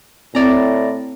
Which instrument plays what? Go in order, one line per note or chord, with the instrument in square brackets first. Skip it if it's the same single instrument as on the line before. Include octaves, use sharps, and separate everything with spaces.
[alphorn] A2 [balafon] C4 [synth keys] D5 A#5